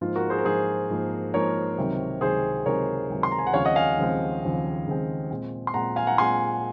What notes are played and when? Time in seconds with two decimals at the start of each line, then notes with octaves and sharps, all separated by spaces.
0.01 G#2 F3 A#3 F4
0.16 F#4 A#4
0.30 G#4 C5
0.38 A#4
0.45 G#2 F3 A#3 G#4 C5
0.89 G#2 F3 A#3
1.34 G#2 F3 A#3 A#4 C#5
1.78 C#2 C3 D#3 F#3 C4
2.21 C#2 C3 D#3 F#3 C4 G#4 C5
2.66 C#2 C3 D#3 F#3 C4 A#4 C#5
3.10 C#2 C3 D#3 F#3 C4
3.23 C6
3.32 A#5
3.39 G#5
3.47 F#5
3.54 D#2 C#3 F3 G#3 C4 C#5 F5
3.65 D#5 F#5
3.76 F5 G#5
3.98 D#2 C#3 F3 G#3 C4
4.42 D#2 C#3 F3 G#3 C4
4.86 D#2 C#3 F3 G#3 C4
5.31 A#2 G#3 C4
5.67 C6
5.74 A#2 G#3 C4 F#5 A#5
5.96 F5 G#5
6.07 F#5 A#5
6.18 A#2 G#3 C4 G#5 C6